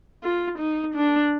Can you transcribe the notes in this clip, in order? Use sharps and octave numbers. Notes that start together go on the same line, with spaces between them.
F4
D#4
D4